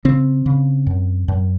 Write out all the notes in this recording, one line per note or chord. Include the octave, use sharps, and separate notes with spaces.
C#3 C4
C#3
F#2
F#2